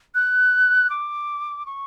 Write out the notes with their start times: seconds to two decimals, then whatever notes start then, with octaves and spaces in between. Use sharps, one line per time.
0.15 F#6
0.90 D6
1.66 C#6